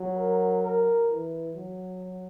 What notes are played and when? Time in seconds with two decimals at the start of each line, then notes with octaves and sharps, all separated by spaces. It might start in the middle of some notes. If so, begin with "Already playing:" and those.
Already playing: F#3
0.16 A#4
0.63 A#4
1.08 E3
1.55 F#3